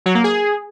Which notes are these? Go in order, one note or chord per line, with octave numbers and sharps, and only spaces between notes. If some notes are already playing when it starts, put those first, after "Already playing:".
F#3
A#3
G#4